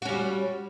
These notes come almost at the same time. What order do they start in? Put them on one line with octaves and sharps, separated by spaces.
F#4 C#4 G3